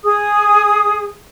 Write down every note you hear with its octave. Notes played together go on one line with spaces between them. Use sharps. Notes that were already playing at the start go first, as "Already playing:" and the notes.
G#4 D#6